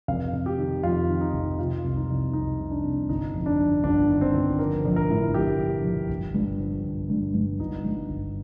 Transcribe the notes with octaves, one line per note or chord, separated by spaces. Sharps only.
F1 F5
F1
G4
D#3
F2 F4
D#3
D#4
F1
C3 F4
C2
D#4
C2
C2 D#4
C3
D4
C2
G1 D#4
F2
D4
F2
G1 D4
D#3
C4
G1
F3 A#4
A#1
A#4
A2
A#1 G4
A#1
A#1
G1
G2
F3
G1
G2
G2
G1 D#4
G2
G1